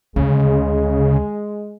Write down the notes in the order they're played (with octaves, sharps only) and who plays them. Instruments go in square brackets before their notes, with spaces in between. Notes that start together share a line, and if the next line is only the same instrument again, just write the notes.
[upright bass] D2 [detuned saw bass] C#3 [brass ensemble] G#3